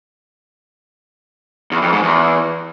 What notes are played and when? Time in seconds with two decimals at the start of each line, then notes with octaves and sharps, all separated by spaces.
1.72 E2
1.82 F2
1.93 G#2
2.03 E2